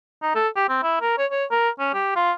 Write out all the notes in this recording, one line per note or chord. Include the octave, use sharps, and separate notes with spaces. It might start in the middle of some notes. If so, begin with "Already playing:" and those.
D#4
A4
G4
C4
E4
A#4
C#5
C#5
A#4
C#4
G4
F4